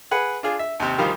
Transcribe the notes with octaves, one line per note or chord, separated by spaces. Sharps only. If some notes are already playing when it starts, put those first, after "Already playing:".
G#4 B4 F#5
D4 F4 G#4
E5
D#2 C3
D2 D#3 F3 G3 F5